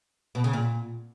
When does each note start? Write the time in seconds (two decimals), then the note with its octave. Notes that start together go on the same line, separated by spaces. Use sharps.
0.35 B2
0.44 C#3
0.53 A#2